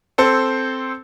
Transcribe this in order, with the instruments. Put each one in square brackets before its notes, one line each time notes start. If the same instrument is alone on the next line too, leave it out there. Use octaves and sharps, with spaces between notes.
[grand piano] C4 A4 C5